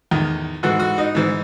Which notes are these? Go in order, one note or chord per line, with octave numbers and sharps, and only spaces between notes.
E2 D#3
G#2 E3 F#4
F#4
D#4
G#2 E3